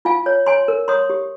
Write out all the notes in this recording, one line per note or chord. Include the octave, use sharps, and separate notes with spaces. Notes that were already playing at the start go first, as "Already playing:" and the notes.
F4 F5 G#5
C#5
C#5 G#5 C6
A#4
C#5 C6 D#6
G4